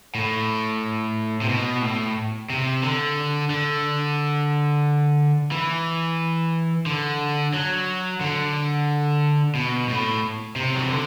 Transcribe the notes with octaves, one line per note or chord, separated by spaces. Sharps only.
A2
C3
B2
A2
C3
D3
D3
E3
D3
F#3
D3
B2
A2
C3
F#3
E3
D3